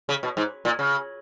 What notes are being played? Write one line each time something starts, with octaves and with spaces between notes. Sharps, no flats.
C#3
B2
G#2
A#2
C#3